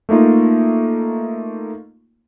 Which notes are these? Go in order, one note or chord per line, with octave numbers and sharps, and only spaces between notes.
A3 A#3 D#4 F4